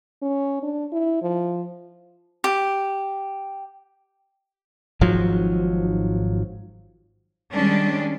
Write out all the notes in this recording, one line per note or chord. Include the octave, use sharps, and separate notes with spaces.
C#4
D4
E4
F3
G4
G#1 G#2 F3 F#3
D#3 G3 G#3 C#4 D4